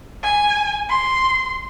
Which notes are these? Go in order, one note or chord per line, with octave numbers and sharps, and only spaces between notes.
G#5
C6